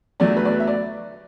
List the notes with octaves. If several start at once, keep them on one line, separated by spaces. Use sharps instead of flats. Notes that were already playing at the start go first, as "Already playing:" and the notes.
E2 D3 F#3 A3 D4 D5
B4
D5
B4
E5
D5